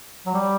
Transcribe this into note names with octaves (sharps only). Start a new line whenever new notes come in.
F#3
G3